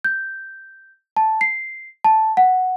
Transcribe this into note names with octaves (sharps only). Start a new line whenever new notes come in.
G6
A5
C7
A5
F#5